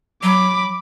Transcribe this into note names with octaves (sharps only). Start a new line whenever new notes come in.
F#3 B5 D6